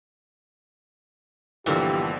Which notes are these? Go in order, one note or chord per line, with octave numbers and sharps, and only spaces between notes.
G1 A#2 D3 E3 F3 G4